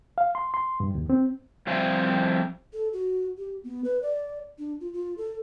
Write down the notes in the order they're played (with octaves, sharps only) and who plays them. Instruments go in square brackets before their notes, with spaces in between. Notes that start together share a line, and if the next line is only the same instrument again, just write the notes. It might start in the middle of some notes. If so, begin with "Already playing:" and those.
[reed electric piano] F5
C6
C6
G2
D#2
C4
[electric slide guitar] F3 G3 C4 C5 E5 G#5
[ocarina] A4
F#4
G4
B3
B4
D5
D4
F4
F4
A4